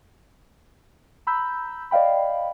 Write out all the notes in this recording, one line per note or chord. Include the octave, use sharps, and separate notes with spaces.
A#5 B5 E6 G6
D5 D#5 F5 G5 B5